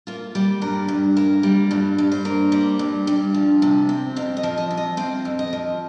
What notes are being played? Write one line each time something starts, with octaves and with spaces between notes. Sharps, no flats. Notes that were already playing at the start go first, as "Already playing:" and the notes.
A#3 F4
G3 G4
G2 A#4
G2
A#3
G3
G2 F4
G2
C5
A#3
G3
G2
G2
F3
C3
C4
F2 F5
D#5
F3
D#5
C3
D#5
C4 F5
F2
D#5
F3